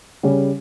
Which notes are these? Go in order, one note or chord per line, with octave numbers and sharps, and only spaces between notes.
C#3 G3 C#4